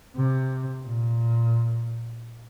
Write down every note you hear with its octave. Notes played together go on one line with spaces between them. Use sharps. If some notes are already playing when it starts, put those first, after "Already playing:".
C3
A#2